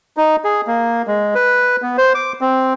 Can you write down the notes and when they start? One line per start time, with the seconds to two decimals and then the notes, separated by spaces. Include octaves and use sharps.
0.17 D#4
0.44 G#4
0.67 A#3
1.07 G#3
1.35 B4
1.82 B3
1.98 C5
2.15 D6
2.41 C4